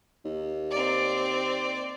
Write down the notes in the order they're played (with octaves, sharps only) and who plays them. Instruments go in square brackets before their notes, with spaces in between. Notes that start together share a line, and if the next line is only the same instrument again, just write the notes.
[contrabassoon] D#2
[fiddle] C4 D5